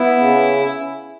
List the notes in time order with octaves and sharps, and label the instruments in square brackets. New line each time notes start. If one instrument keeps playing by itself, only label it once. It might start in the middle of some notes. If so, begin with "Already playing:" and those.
Already playing: [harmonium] B3 [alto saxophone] E4
[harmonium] C#3